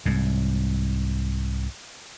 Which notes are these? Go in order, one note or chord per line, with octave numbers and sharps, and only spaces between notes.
C2 G#2